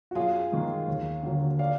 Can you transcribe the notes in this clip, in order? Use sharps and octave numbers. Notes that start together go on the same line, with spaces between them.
F#4
F#2 F4 G#4
D#3 G#3
D#2
D3 F#3 A#3
D5 F5